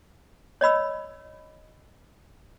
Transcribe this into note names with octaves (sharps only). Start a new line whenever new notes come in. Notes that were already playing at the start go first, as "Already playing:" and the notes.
C#5 D#5 B5 E6